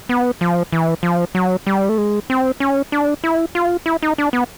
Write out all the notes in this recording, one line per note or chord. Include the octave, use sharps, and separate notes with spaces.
B3
F3
E3
F3
F#3
G3
A3
G#3
C4
C#4
D4
E4
F4
E4
D#4
D4
B3